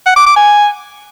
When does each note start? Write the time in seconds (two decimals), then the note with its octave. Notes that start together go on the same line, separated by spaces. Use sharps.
0.06 F#5
0.16 D6
0.26 D6
0.36 G#5